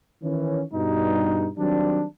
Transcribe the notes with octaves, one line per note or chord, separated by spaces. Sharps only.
D#3 E3 C#4
G2 B2 G3 D#4
D#3 F#3 G3 C4 D4